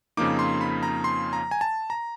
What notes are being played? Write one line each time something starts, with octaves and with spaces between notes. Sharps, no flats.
F2 C#3 F3 A#3 D#4 D6
C6
B5
A#5
C6
A#5
G#5
A5
A#5